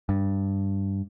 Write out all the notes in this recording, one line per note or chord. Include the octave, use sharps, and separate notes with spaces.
G2